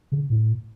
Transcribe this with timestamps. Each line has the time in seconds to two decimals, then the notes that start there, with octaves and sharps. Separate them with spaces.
0.12 C#3
0.30 A2